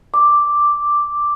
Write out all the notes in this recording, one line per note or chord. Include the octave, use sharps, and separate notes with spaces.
D6